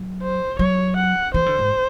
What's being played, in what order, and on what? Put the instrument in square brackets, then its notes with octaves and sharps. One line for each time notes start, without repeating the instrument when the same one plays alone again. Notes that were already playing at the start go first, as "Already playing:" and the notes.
Already playing: [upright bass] F#3
[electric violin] C5
[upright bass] F#3 [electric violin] C#5
[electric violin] F#5
[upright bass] E3 [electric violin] C5
[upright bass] D3
G#2